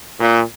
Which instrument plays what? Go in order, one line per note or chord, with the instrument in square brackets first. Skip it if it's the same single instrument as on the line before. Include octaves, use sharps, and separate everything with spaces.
[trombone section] A#2